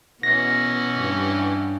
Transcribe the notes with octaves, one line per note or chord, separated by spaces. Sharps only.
B2 E3 C#4 F#5 A#6
G2